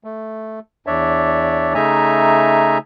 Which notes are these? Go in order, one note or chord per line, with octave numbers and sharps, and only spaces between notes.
A3
E2 D4 C#5 D5 E5
C#3 A3 D#4 E5 G#5 A#5